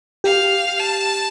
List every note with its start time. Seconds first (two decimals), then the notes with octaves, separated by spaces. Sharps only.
0.24 G4 F5
0.79 A5